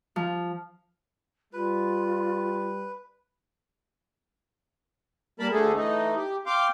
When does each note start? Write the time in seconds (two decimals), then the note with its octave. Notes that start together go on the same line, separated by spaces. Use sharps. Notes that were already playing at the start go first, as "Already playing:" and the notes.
0.16 F3
1.53 G3 F4 B4
5.40 G3 A#3 A#4 A5 B5
5.52 D2 D3 A3 G#4 A4
5.75 E3 A3 D#4
6.16 G4
6.46 F5 G5 C6 D6